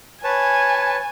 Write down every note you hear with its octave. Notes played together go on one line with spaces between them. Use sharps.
B4 C#5 G#5 A5